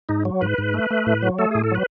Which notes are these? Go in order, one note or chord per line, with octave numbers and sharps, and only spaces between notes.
G#2 D#4
F#3
G#2 B4
G#2
A3
A3
A2
F#3
A3 A4
A2 G#4
A4
F#3 B4